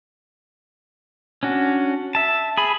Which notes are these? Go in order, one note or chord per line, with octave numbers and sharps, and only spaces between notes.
C#4 D4 F#4
E5 A5
G#4 B5